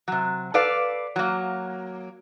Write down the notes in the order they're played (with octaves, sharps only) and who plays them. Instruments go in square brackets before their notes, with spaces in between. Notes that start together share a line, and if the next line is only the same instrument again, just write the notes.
[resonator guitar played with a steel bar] C3 F#3
A4 B4 D5 F5
F#3 A#3